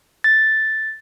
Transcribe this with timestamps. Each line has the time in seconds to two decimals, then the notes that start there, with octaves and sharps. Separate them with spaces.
0.24 A6